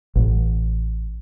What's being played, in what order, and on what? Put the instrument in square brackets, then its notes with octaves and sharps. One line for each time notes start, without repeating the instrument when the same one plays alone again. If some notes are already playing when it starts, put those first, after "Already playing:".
[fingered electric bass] A1